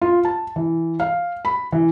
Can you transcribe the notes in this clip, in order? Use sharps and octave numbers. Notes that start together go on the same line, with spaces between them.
F4
A5
E3
F5
B5
E3